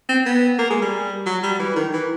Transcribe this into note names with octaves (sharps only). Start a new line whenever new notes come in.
C4
B3
A#3
G#3
G3
F#3
G3
E3
D#3
E3